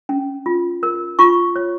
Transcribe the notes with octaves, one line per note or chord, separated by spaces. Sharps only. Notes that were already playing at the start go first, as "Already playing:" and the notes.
C#4
F4
A#4
F4 C#6
C#5